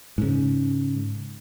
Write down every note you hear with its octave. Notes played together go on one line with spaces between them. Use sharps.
G#2 C#3